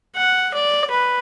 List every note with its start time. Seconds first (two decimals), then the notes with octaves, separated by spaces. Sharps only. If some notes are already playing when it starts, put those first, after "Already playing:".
0.17 F#5
0.54 D5
0.91 B4